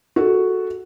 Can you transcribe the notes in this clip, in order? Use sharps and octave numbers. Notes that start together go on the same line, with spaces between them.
F#4 G#4 A4